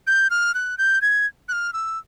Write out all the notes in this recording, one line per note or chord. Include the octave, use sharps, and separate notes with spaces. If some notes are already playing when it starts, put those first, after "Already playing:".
G6
F6
F#6
G6
G#6
F#6
F6
E6